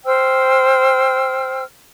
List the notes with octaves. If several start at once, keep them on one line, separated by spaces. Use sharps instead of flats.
C5 G5 E6 F6